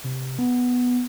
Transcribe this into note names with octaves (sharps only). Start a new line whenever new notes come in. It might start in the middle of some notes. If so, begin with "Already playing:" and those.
C3
B3